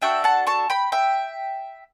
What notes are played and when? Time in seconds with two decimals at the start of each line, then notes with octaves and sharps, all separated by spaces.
0.02 D4 F#4 A4 E5 G5
0.24 F#5 A5
0.47 A5 C#6
0.70 G5 B5
0.92 E5 G5